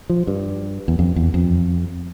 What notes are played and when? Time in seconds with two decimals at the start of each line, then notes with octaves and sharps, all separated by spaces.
0.10 F3
0.27 G2
0.88 E2
0.99 F2
1.16 E2
1.34 F2